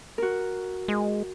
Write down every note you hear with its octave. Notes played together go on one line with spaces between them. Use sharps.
F#4 A#4
G#3